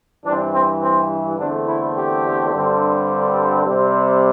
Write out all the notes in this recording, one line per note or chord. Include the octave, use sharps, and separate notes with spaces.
G2 E3 C4 D4
C4
C4
E2 D3 A3 C4 D4
E4
G4
G2 D3 G3 C4
C3 G3 C4